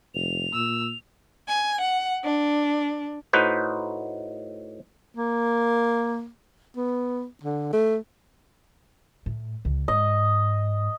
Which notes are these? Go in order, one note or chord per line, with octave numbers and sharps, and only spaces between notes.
F1 F7
A#2 E6
G#5
F#5
D4
A2 D#4 F#4 B4 C5
A#3
B3
D3
A3
A2
C#2
G#2 D#5